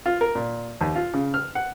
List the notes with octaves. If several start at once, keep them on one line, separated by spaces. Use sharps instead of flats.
F4
A#4
A#2
D#2
F4
C#3
F6
F#5